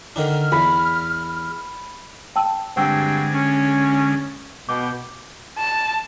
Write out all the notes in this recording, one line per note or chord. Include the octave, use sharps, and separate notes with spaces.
D3 D#3 D4 F6
E2 B5
G5 A5 E6
G2 D3 G#3 C4 F#4 G5 E6
C#4
B2 G5 D6
A5